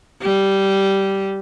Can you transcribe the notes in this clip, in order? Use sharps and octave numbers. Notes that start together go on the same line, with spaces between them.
G3